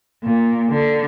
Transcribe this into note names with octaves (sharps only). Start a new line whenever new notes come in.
A#2
D3